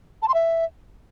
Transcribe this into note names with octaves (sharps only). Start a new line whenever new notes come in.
A5
C6
E5